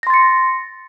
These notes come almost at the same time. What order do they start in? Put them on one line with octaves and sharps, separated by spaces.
A#6 C6 A6 C#7